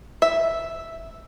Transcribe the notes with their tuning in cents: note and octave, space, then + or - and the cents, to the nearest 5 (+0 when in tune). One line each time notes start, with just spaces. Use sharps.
E5 +0